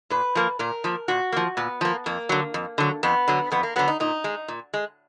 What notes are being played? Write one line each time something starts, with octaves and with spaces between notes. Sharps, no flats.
A#2 B4
F3 A#3
A#2 A#4
F3 A#3
A#2 F#4
F3 A#3
A#2 B3
F3 A#3
F2 A#3
D3 F#3
F2
D3 F#3
F2 B3
D3 F#3
F2 B3
A#3
D3 F#3 B3
D#4
A#2 D#4
G#3
A#2
G#3